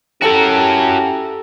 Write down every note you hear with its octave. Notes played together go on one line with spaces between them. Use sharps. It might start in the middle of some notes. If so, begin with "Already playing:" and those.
C#4 E4 F#4 G4 A4 A#4 A5 A#5